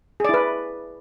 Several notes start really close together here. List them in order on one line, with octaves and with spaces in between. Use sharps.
G#4 D5 E4 B4